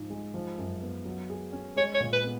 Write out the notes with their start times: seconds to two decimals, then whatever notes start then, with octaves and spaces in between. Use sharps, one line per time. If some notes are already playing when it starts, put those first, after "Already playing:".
Already playing: G#2 F3
0.10 G#3
0.34 F3
0.58 F#2
0.82 B3
1.05 F#3
1.30 G#4
1.53 C#4
1.76 G#3 C#5
1.94 C#5
2.00 A#2
2.13 B4
2.24 B3